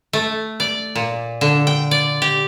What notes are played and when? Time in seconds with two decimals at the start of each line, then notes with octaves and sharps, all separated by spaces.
0.13 A3
0.60 D5
0.95 A#2
1.41 D3
1.67 G5
1.91 D5
2.22 G4